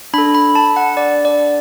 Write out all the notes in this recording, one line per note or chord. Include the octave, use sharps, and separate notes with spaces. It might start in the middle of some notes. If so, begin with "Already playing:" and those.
D4 A4 B5
B5
A5
F#5
D5
D5